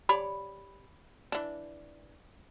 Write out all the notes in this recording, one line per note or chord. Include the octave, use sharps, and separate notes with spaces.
G4 C#5 D5 B5
E3 D4